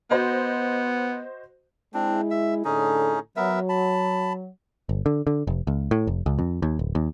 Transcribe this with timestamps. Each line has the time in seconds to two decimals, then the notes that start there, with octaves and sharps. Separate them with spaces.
0.11 B3 F#4 C5 D#5
1.94 G#3 C4 D4 E4
2.31 E5
2.65 A2 D3 C#4 D#4 G#4 A4
3.36 F#3 B3 A#4 E5
3.69 A5 B5
4.89 G1
5.06 D3
5.27 D3
5.47 F1
5.67 C#2
5.91 A2
6.07 F1
6.26 C#2
6.39 F2
6.62 D#2
6.79 D1
6.95 D#2